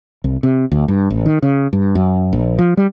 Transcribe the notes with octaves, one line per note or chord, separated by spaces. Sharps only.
C2
C3
D2
G2
A1
D#3
C#3
G2
F#2
A#1
F3
G3